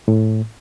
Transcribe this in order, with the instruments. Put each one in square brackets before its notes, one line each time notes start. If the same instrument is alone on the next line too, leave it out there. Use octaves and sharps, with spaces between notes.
[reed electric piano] A2